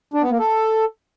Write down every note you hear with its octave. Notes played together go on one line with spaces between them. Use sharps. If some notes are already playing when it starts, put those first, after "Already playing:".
D4
B3
A#3
A4